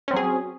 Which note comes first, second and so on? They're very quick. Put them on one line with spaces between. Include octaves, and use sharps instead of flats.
C#4 C4 F#3 G#4